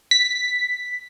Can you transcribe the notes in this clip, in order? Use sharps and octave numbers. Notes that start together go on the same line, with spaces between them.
B6